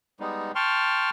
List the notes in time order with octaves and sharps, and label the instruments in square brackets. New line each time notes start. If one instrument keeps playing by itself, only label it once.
[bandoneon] G3 G#3 B3 D#4
G5 A5 C6 C#6 F6